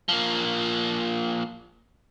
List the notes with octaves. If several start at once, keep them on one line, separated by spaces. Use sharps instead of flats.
F3 A#3